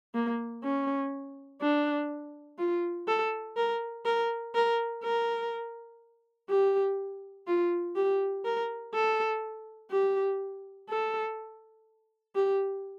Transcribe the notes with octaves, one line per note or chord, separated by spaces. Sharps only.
A#3
C#4
D4
F4
A4
A#4
A#4
A#4
A#4
G4
F4
G4
A#4
A4
G4
A4
G4